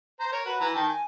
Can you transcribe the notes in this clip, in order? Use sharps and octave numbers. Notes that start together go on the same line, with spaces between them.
C5 A#5
A#4 C#5
F#4 B4
E3 B4 A#5
D#3 G5 A5
G#5